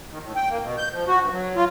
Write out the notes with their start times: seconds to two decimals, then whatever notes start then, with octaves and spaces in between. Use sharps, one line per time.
0.10 D#3
0.23 A2
0.35 G5
0.49 A#3
0.62 B2
0.78 G6
0.92 F3
1.07 F#4
1.20 G2
1.32 F#3
1.56 F4